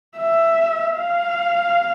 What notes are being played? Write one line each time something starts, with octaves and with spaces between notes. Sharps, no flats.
E5
F5